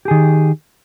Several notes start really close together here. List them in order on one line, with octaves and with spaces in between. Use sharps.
G4 G#4 D#3